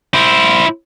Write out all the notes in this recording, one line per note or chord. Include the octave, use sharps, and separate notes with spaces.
E4 C5